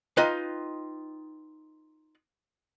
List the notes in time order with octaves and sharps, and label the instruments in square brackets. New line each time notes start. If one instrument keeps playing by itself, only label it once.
[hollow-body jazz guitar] D#4 F4 B4 D#5 G5